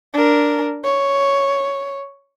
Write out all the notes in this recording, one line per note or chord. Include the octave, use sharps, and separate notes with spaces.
D4 A#4
C#5